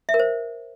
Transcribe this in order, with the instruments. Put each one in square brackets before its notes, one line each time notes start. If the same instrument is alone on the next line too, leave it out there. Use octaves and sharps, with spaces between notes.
[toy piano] E5
A#4
C5